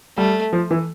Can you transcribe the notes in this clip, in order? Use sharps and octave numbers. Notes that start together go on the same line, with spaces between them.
G3 A3
F3
E3